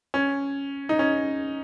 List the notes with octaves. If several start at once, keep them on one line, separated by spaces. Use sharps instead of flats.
C#4
D#4
C#4